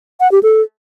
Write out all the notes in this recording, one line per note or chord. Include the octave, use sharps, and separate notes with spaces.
F#5
G4
A4